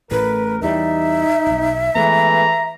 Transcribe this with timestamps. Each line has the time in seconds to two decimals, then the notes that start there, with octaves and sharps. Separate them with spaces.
0.11 A1 A2 A3 A#4 B4
0.62 E2 E3 G3 D#4 E5
1.47 D1 B1
1.95 E3 G#3 A3 B3 A#5